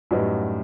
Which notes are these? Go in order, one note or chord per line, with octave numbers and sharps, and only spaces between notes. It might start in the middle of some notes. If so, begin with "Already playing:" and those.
F#2 A2 G3 D#4 F#4 B4 D#5